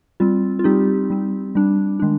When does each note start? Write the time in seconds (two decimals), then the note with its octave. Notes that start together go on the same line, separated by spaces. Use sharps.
0.20 G3 C4 F4
0.59 F4
0.64 G3 C4 D#4 G4
1.10 G3 C4
1.55 G3 D4
2.00 D#3 G#3 D4